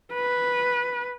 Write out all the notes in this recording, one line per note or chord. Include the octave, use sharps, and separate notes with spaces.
B4